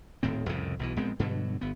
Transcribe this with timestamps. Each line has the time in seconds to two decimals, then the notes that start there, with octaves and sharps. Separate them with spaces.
0.23 D#1 A2 D#3 C4
0.49 C2 F2 A2 C#3
0.79 B1 B2 E3
0.96 A#1 G#3 B3 C4
1.19 G2 B2 D3 F#3
1.61 G1 B3